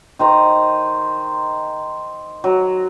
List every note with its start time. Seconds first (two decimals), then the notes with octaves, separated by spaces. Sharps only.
0.19 D#3 C5 A#5
2.44 F#3